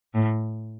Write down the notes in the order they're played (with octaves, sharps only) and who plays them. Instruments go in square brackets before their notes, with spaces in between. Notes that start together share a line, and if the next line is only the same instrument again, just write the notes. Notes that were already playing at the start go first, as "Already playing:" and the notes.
[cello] A2